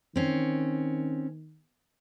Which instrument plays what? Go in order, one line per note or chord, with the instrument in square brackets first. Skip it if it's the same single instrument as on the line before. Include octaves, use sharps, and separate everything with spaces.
[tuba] D#3 [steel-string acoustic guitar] C4 C#4